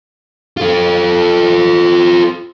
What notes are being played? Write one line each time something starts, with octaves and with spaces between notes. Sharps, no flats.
F4 A4